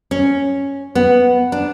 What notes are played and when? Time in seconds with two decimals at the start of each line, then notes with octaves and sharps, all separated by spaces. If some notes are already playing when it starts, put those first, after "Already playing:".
0.11 C#4
0.95 B3
1.52 D4